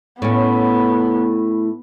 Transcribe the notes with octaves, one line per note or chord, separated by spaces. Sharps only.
A2 B3 C#4